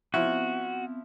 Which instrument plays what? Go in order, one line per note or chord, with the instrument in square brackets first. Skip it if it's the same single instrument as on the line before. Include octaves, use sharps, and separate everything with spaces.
[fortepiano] F3 E4 [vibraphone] B3 C4 [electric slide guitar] F#4